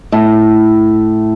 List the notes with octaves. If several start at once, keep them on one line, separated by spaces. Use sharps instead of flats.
A2